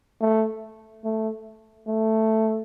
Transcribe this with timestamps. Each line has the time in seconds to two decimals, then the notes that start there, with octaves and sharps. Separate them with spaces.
0.21 A3
1.05 A3
1.88 A3